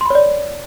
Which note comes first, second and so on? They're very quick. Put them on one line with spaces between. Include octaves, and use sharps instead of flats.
C6 B5 C#5 D5